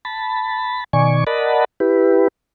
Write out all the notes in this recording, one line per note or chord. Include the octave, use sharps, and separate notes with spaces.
A5 B5
B2 D#3 D5 G#5 C#6
A#4 D5 D#5 F#5 A5 B5
E4 G4 B4